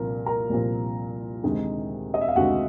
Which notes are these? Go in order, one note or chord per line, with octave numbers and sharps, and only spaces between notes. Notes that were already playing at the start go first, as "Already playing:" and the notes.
Already playing: C2 A#2 F3 A#4
A#4 A#5
C2 A#2 F3
D2 C3 D#3 G#3
D#5
E5
F5
D2 C3 D#3 G#3 F#4 F#5